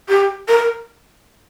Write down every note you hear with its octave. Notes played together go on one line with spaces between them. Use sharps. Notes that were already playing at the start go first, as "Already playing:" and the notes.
G4
A#4